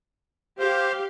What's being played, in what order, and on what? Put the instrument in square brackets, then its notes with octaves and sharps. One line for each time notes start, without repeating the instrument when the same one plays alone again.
[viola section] G4 F5 [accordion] C5